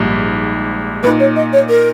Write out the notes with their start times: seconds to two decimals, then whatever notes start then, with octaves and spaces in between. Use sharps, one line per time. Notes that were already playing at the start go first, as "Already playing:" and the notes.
Already playing: A#1 G#2 G3
1.03 A#2 A#3 D#4 B4
1.20 C#5
1.36 D#5
1.53 C#5
1.69 A#4